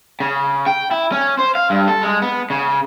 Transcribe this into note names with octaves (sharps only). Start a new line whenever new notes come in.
C#3
G5
E4
C#4
C5
F5
G2
A4
G#3
B3
C#3